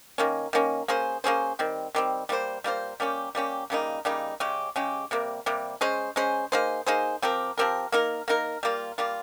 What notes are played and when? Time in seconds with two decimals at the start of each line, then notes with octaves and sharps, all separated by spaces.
0.18 D#3 A#3 C#4
0.53 D#3 A#3 C#4
0.88 A#3 C#4 G#4 C5
1.24 A#3 C#4 G#4 C5
1.59 D#3 G3 C4
1.95 D#3 G3 C4
2.29 G3 A#3 F4 C5
2.64 G3 A#3 F4 C5
3.00 G3 A#3 C#4 G4
3.35 G3 A#3 C#4 G4
3.70 C#3 G3 A#3 D#4
4.05 C#3 G3 A#3 D#4
4.40 C#3 G#3 C#4 G4
4.76 C#3 G#3 C#4 G4
5.11 C3 G3 A#3
5.46 C3 G3 A#3
5.81 G#3 C#4 G#4 C5
6.16 G#3 C#4 G#4 C5
6.52 A#3 D#4 G#4 C5
6.87 A#3 D#4 G#4 C5
7.22 F3 C4 G4 A#4
7.58 F3 C4 G4 A#4
7.92 A#3 D#4 A#4
8.28 A#3 D#4 A#4
8.63 G3 A#3 F4
8.98 G3 A#3 F4